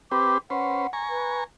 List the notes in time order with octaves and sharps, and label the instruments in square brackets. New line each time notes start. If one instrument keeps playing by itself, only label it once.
[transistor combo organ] C4 G4 B4 [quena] D6
[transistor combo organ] C#4 B4 C5 [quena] F#5
[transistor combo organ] G#5 A#5 C#6
[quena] B4